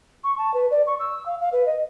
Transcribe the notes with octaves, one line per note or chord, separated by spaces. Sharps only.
C#6
A5
B4
D5
C#6
E6
F5
F5
B4
D#5